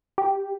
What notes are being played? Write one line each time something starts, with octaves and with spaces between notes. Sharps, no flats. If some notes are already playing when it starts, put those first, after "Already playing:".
G4